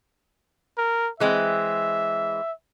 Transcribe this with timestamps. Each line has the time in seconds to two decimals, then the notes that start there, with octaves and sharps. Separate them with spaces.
0.78 A#4
1.20 E3 G#3 C4 E5